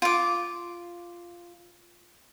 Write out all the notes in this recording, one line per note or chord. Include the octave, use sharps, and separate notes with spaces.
F4 D6